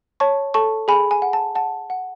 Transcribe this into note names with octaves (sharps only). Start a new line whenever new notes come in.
C#5 A5 C#6
A4 A5 C#6
G#4 G#5 B5
G#5
F#5
A5
F#5 A5
F#5